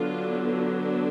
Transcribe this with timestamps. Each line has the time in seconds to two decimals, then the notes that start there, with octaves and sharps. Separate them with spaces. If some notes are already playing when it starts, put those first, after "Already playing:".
Already playing: D3 F#3 B3 D4 F4